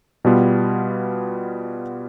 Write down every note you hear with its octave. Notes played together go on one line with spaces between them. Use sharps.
B2 G3 B3 F4